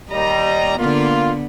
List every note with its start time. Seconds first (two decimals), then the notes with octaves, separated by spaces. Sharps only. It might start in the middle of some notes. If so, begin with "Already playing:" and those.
0.10 D#2 G3 D#5 A#5
0.78 D3 A#3 B3 F4